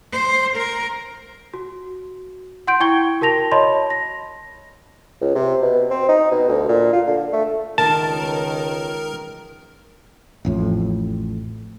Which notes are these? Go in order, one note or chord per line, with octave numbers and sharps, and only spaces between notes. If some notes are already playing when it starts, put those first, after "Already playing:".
C5
A#4
F#4
F#5 C6 G6 D7
E4 G5 C#6 G#6 G7
F#4 A#4 A5 A#6 F7
C#5 D#5 A5 B5 C6
A#6
C#2
C3
B2
C4
D#4
B2
D2
A#2
F4
D3
A3
C#2 D#3 A#4 A5
A1 F2 A2